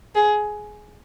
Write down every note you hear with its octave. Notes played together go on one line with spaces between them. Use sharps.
G#4